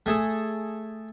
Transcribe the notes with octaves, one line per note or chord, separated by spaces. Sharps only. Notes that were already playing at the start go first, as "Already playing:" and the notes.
A3 G#4 A4